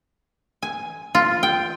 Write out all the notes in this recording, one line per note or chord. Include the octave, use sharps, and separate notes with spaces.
G#5
F4
G5